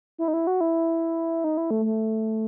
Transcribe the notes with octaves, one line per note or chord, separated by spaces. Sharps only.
E4
D#4
E4
F#4
E4
D#4
E4
A3
A3